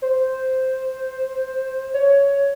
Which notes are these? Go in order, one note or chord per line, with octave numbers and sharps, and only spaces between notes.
C5
C#5